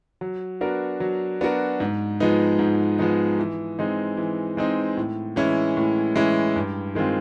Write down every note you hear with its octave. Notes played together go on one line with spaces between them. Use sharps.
F#3
B3 D4 F#4 A#4
F#3
B3 D4 F#4 A#4
G#2
F3 G#3 B3 D#4
G#2
F3 G#3 B3 D#4
E3
G#3 C4 D#4
E3
G#3 C4 D#4
A2
E3 G#3 C#4 E4
A2
E3 G#3 C#4 E4
G2
D#3 G#3 C4 F4